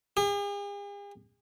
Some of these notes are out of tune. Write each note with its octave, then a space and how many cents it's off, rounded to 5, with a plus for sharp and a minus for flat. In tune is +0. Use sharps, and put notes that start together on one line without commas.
G#4 -45